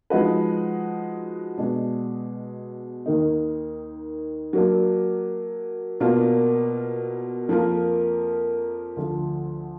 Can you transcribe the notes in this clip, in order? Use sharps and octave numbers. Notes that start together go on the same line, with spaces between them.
F3 G#3 D#4 F#4 B4
B2 G#3 D4
D#2 D#3 A#3 D#4
F#3 A#3 D4
B2 A#3 D4 F4 A#4
F2 F3 A#3 F4 A#4
D2 D3 F3